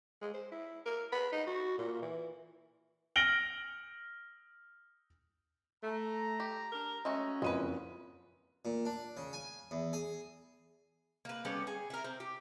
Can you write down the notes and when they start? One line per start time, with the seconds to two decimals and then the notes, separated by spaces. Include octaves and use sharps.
0.21 G#3
0.34 C5
0.51 E4
0.85 A#4
1.12 B4
1.32 D#4
1.47 F#4
1.78 A#2
2.02 E3
3.16 F6 A#6 D7 F#7 G7
5.84 A3 A#5
6.40 G4
6.72 D4 A#4
7.05 G#3 A3 C#4 F#4
7.42 F#1 F2 G#3 B4 D#7
8.65 A#2
8.85 D4
9.17 C#3
9.33 G#5
9.71 E2
9.93 G#4
11.25 A#3 B4
11.45 G3 B3 C#4 A4
11.67 G#4
11.90 E4 A#4
12.04 C4
12.20 G4